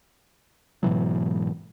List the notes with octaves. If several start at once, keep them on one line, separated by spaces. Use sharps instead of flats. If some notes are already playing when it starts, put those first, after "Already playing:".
G#2 B2 E3 F#3